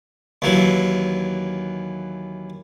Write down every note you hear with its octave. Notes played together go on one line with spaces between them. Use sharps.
D#2 E3 F#3